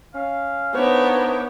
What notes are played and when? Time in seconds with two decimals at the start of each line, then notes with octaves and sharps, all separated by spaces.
0.15 C#4 F5
0.75 A#3 B3 D4 D#4 C5 C#5 E5 D6